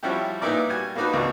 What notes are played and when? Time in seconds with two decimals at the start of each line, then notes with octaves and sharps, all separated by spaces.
0.03 F3 G3 C#4 E4 F#4 G4
0.42 A#2 B3 D#4 E4 A#4 D5
0.69 G3 F#4 G#5
0.95 A#3 B3 D4 D#4 F#4 B4
1.13 G#1 C#2 A#3 D4 F#4